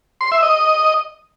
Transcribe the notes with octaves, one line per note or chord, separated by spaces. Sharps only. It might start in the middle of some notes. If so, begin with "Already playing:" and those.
C6
E5
D#5